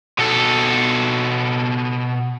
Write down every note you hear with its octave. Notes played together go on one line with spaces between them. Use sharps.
B2 A4